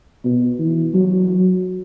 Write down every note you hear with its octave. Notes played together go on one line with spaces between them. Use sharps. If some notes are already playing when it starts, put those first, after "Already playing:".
B2
E3
F#3